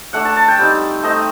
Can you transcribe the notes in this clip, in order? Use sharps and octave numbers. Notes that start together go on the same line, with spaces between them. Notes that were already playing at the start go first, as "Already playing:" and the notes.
A3 D4 F#5
A5
A5
G5
G3 C4 D#4 G5
A3 C4 D#4 D#5